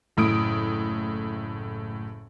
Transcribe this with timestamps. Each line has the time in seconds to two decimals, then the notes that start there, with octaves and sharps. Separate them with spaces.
0.17 F#1 A2 D#6 D7